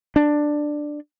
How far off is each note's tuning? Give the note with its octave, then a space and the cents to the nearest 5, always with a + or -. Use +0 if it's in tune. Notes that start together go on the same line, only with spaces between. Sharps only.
D4 +10